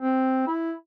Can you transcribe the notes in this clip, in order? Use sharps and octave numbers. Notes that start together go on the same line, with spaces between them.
C4
E4